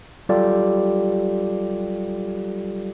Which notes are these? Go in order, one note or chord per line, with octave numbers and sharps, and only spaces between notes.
F#3 G3 F4 G4 A4 D5